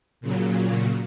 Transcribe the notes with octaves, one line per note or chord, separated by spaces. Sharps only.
A#2 C#3 F#3